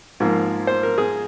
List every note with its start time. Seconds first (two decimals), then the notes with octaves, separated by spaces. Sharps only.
0.20 G#2 F3 A#3
0.67 C5
0.83 A#4
0.98 G#4